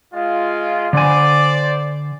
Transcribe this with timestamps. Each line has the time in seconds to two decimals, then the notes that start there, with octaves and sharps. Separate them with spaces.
0.13 G#3 F4
0.93 D3 C5 D5 G#5